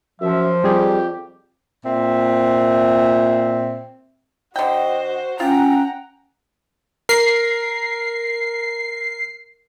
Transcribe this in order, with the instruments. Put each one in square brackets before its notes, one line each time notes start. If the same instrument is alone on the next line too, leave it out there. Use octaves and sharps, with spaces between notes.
[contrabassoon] F#2 [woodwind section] F3 [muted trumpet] E5
[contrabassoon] F2 [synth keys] G3 G#4 [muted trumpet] G4
[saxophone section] A#2 C4 E5
[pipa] D3 G5 [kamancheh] F#4 C5 [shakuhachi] D#5
[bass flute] C#4 [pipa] F4 [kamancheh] F#5 A#5 [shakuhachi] G5
[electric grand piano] A#4 [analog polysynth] C7